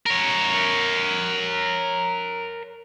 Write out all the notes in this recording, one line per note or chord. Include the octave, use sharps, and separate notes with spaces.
A#4 C#5